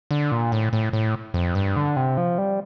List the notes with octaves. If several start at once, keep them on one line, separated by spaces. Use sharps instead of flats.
D3
A#2
A2
A2
A2
F2
G2
D3
C3
F3
G3